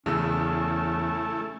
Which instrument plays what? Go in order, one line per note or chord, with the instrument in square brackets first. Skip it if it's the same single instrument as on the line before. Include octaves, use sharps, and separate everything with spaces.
[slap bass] E2 [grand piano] C#3 E6 [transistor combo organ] A3 E4 [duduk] C#4